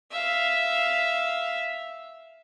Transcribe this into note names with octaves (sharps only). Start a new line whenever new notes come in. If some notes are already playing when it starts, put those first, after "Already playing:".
E5 F5